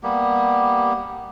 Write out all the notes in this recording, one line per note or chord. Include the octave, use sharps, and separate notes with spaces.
G3 A#3 B3 G4